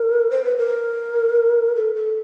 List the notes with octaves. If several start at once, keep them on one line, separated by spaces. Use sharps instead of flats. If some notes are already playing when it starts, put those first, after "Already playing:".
Already playing: A#4
C5
B4
A#4
A4
A4